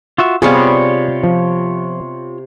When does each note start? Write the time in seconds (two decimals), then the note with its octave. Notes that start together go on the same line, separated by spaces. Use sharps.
0.18 F4 F#4 E5
0.42 C3 G3 B3 F4 G#4 C#5 F5
1.24 F3